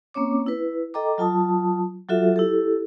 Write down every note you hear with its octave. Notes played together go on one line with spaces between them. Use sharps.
A#3 C4 C#4 C#5 D6
E4 B4
A4 D#5 G5 A#5 D6
F#3 F4 A5 D#6
F#3 F4 F#4 A4 E5
E4 G4 A4